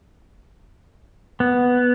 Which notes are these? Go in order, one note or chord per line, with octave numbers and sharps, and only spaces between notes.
B3